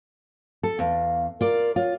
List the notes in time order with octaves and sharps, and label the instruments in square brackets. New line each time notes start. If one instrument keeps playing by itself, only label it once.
[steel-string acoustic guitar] A4
[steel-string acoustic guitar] E2 [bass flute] F5
[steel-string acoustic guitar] F4 D5 [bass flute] A#4
[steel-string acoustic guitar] F4 [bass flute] C#5